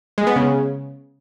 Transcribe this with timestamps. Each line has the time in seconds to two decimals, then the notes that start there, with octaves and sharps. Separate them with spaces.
0.18 G#3
0.27 B3
0.36 C#3